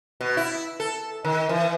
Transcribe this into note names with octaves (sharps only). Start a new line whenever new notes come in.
B2
E4
A4
D#3
E3